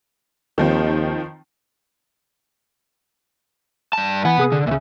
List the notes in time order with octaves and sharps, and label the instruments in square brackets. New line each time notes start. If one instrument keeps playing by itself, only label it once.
[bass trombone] D#2 [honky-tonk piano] D#3 F3 C4
[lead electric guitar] G2 A5
[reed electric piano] E3 G#5 B5 [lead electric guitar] B3 F#5
[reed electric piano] C3 G#4 D#6
[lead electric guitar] D3
[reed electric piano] C#2 E5 [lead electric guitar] A#2 C#3